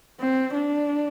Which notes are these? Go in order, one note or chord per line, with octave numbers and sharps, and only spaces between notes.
C4
D4